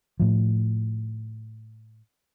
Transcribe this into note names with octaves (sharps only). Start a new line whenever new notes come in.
A2 F3